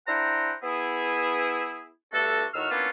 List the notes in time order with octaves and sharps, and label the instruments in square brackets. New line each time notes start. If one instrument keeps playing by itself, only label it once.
[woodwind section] D4 E4 C5 F#5 G5 A#5
B3 E4 G#4
G2 A3 D4 F#4 A4
A2 D#3 F#4 E6 F6
A#3 B3 C#4 D4 E4 F4